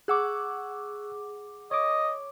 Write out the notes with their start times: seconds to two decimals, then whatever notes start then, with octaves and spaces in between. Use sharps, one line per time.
0.08 G#4 F#5 C#6 D6 E6 F#6
1.71 C#5 D#5 D6